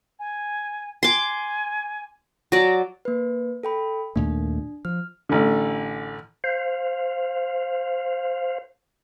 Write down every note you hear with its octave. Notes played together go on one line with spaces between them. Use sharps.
G#5
G#5 C6 D6
F#3 D5 A#6
A#3 B4
A4 G5 B5
D#2 A#2 A3 D4
F3 F6
A1 D3
C5 F5